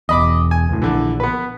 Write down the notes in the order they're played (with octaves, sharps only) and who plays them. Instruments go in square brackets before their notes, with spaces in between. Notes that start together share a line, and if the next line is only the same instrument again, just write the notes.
[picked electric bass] E1 E2 [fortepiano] D#5 B5 D6
[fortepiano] G#5
[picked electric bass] C#2 A2
[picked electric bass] A#1 [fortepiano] D3 E3
[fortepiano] B3 B4